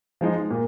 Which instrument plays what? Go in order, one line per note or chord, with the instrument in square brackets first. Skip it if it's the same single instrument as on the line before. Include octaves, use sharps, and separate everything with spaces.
[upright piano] F3 G#3 D#4
A#2